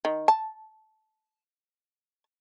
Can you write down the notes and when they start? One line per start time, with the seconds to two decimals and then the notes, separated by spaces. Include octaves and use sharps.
0.05 D#3
0.28 A5